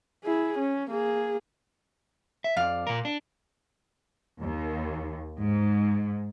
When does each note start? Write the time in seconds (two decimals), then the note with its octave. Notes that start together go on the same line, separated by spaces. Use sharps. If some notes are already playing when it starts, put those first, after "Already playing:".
0.24 E4 G#4
0.58 C#4
0.90 A#3 G#4
2.44 E5
2.56 F2 D5 F5
2.87 A#2 A#4
3.05 D4
4.41 D#2
5.40 G#2